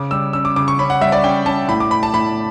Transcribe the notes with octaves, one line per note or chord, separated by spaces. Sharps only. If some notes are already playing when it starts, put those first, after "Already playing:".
Already playing: C#3 D6
G3 E6
C#4 E6
D6
C#3 D6
C#6
C#4 B5
F#5
G3 E5
D5
C#4 G5
C#4 A5
A2 B5
D6
A2 B5
A5
A2 B5